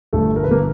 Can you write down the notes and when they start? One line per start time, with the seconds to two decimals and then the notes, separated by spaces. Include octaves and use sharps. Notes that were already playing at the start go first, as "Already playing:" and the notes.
0.13 G1 A3 A4
0.36 A#4
0.44 B4
0.48 G1 A#3 A#4